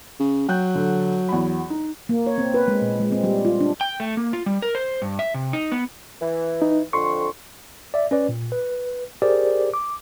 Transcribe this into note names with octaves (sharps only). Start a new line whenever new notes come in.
C#3
F#3 G5 F#6 G6
D3
E2 B5
D#4
A#3
C#5
C4
B4
G#3
A#2
G#3
C4
G3
F4
D4
G5
A3
A#3
F4
G3
A#4
C5
G2
E5
C3
D#4
B3
E3
D#4
F2 D3 C6 C#6
D5 E5
C#4 B4 D5
A#2
B4
G4 G#4 A#4 C5 D5
D6